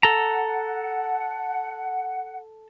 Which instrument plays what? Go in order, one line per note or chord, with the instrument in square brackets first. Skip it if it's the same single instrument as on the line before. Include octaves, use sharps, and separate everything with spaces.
[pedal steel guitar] A4 A#5 [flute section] F#5